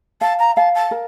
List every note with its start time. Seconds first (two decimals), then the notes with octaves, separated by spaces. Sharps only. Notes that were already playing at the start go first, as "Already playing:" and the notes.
0.21 F5 A5
0.39 A#5
0.57 F5 A5
0.75 A5
0.91 A#4